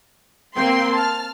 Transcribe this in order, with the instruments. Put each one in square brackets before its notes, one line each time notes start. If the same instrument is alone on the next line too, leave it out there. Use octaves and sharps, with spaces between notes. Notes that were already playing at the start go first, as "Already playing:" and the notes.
[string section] A#3 C4 G5 C6
A5 F6